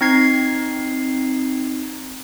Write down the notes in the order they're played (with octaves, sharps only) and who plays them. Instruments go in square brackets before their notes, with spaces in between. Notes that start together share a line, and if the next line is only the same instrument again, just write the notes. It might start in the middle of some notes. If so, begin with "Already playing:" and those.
[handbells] C4 D#4 G#6 C7